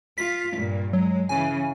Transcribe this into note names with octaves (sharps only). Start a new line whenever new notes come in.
F4 B6
G2 A#2
F#3 G#3
C#3 E3 G#5